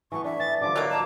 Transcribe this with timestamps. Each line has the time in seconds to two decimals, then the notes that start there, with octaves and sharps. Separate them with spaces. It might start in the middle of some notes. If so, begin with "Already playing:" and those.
0.12 E3 A3 B3 C#6
0.24 D4 E5
0.40 E3 A6
0.61 D3 F3 G3 D6
0.76 F#3 A#3 D#5
0.89 A5 A#5